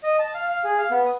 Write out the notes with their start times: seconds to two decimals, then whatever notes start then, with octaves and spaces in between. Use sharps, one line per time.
0.03 D#5
0.19 A5
0.34 F5
0.49 F5
0.64 G#4
0.78 F5
0.91 B3
1.06 D#6